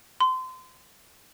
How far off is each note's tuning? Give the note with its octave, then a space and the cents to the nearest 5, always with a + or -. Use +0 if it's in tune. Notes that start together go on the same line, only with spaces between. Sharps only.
C6 -25